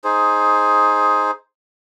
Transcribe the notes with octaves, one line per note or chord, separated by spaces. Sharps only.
D#4 G#4 C5